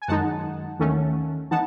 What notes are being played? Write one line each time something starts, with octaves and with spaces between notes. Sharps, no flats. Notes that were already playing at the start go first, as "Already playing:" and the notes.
G#5
F#2 D#3 G#3 D#4 F#5 A5
D#2 D#3 A3 C#4
E3 B3 D#4 F#5 A5